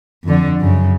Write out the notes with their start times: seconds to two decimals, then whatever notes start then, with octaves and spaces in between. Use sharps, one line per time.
0.24 F2 D3
0.60 F#2 C#3